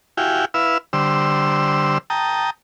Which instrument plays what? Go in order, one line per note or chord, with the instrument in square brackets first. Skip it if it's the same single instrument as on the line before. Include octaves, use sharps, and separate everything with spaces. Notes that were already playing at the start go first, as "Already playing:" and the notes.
[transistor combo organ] E4 F#4 G4 F5 G5 G#5
E4 B4 F5 E6
D3 G3 C5 E6
G5 A5 A#5 D#6